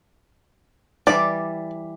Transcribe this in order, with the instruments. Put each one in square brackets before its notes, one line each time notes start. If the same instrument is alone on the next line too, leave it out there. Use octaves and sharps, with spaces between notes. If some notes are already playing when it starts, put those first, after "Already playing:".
[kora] E3 G3 [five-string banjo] D5